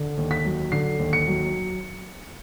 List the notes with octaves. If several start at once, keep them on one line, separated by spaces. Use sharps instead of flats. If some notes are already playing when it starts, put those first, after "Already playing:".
Already playing: D3
D#2
B6
F#3
D3 C7
D#2
C#7
F#3